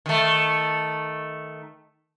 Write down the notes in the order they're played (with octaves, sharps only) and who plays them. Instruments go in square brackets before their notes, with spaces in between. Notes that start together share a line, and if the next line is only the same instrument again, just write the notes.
[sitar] D#3 A3